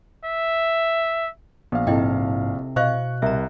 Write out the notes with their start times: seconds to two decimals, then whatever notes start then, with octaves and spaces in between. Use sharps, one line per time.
0.25 E5
1.72 A#1 B3 F5
1.87 G#2 C3 E4 A4 D#5 G5
2.76 B2 C5 D#5 F5 C#6 F#6
3.22 C2 A#4 E5 A#5